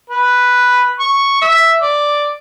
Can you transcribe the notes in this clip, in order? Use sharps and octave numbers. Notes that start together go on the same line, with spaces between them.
B4
C#6
E5
D5